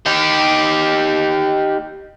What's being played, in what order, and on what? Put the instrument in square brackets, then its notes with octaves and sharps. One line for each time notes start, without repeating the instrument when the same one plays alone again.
[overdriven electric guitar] D#4 G4